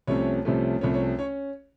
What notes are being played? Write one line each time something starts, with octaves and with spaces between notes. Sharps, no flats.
C2 C3 F3 A3 C#4 C#5
C2 C3 F3 A3 C#4
C2 C3 F3 A3 C#4 C#5
C#5
C#4 C#5